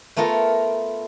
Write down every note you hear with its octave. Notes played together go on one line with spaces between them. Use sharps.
A3 B3 F4 A#4